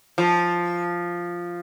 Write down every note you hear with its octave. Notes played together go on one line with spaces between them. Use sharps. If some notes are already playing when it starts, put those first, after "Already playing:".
F3